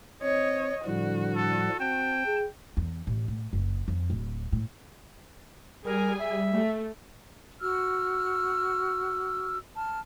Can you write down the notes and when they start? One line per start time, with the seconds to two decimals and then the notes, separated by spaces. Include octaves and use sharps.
0.23 C4 C#5 D#5
0.85 A2 D3 F3 G3 F#4
1.36 A4
1.80 C4 G5 A5
2.26 G#4
2.77 E2
3.07 A1
3.28 A2
3.53 F#1
3.88 F2
4.10 D1
4.52 A2
5.85 G3 G#4 A#4 G#5
6.19 E5
6.53 A3
7.60 F#4 E6 F6
9.75 A5 F6